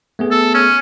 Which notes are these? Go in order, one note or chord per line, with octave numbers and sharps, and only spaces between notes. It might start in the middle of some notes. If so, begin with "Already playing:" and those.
A3 B3 G#4
A4
C#4